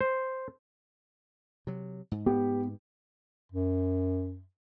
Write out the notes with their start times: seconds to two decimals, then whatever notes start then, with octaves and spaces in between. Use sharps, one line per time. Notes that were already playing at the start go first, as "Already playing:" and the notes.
0.01 C5
1.67 C3 F#3
2.12 G#2
2.26 B3 G4
3.52 F#2